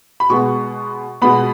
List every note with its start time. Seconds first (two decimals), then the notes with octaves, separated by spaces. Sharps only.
0.20 B5
0.30 B2 G#3 B3 C#6
1.22 B2 G#3 B3 B5